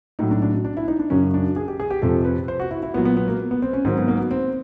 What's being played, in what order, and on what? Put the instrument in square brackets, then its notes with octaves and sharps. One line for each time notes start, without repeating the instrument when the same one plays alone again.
[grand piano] A2 F#3 D#4
D4
D4
D4
E4
D#4
D4
F#2 C#3 F#3 C#4
D4
G#4
G4
G#4
G4
F2 C3 F3 A4
B4
C5
F#4
E4
E4
A#2 B3
F#3
B3
B3
A#3
B3
C4
C#4
G#2 D#3 F#3 C4
B3
A#3
B3
C4